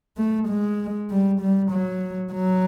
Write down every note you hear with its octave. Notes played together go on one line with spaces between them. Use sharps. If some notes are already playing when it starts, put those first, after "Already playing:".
A3
G#3
G3
G3
F#3
F#3